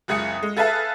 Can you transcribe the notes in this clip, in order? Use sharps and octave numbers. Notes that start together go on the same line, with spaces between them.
F#1 C#2 G#4 D#6 C#7
G#3
G#4 A4 B4 E5 F5 A5